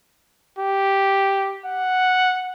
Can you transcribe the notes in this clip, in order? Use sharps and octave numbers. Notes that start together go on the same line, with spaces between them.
G4
F#5